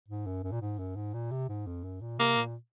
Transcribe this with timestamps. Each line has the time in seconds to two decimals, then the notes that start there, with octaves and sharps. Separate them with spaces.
0.08 G#2
0.26 F#2
0.44 F#2
0.52 A#2
0.61 G#2
0.79 F#2
0.96 G#2
1.14 A#2
1.31 C3
1.49 G#2
1.67 F2
1.84 F#2
2.01 A#2
2.19 C3 A#3
2.37 A#2